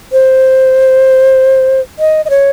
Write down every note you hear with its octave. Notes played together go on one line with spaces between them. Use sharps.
C5
D#5
D#5
C#5